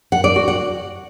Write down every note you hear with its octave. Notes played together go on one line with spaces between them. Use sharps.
F#5
D5
F#4
F#5